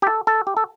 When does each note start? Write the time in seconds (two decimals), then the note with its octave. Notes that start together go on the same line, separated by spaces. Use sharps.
0.02 G4
0.07 A4
0.27 A4
0.47 G4
0.57 A4